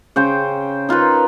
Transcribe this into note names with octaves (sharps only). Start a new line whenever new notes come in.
C#3 C5 G5
D#4 F4 A#4 B4